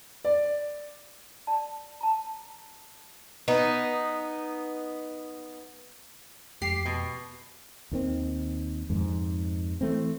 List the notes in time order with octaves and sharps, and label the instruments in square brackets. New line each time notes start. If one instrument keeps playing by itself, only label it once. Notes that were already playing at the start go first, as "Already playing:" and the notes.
[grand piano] D5
[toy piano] D5 A5
A5 A#5
[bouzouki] B3 D#4
[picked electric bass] F2 G#3 A3 [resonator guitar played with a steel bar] G4 [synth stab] C7
[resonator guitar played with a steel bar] B2
[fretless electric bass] D#2 D#3 C4
F2 G#2
E3 A3 C4